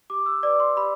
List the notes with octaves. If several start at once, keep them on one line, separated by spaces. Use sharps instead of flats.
G4 D6
E6
B4 D5 D6
C6
G4 B5